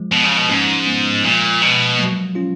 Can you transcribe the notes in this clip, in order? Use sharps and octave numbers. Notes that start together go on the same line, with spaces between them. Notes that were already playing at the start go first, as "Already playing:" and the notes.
Already playing: F3 G#3
B2
C#3
B2
G#2 A#3 C#4
G#3 B3
A#2 F3 G#3
B2
F#3 A#3
C#4 F4